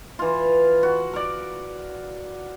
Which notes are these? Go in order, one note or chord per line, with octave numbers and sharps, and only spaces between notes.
E3 F4
F#4
A#4 D5